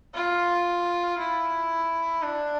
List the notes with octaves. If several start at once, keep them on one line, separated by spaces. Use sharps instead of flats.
F4
E4
D4